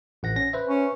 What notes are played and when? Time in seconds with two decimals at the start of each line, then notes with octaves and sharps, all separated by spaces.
0.23 A1 F#5 A#6
0.36 C#4 A#6
0.53 B4 C5 E5
0.68 C#4